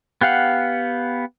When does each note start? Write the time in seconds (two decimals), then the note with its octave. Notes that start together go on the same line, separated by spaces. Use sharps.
0.21 B3 G4 F5 F#5